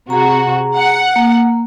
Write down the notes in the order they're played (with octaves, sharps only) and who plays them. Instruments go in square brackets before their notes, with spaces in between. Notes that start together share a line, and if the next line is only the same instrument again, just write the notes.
[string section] C3 F#4 [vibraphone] G#4 A#5
[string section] F#5
[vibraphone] A#3